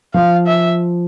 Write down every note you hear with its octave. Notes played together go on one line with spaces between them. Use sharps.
F3 F5
E5